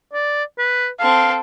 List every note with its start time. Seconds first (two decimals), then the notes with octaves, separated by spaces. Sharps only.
0.13 D5
0.59 B4
0.99 C4 A4 F5